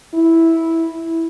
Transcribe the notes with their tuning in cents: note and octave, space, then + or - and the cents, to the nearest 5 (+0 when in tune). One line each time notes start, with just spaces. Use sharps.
E4 -5